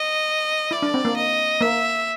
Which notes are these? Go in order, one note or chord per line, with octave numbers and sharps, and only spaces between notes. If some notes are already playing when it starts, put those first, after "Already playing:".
Already playing: D#5
E4 D5
D4
C4
A#3
D#5
A#3 E5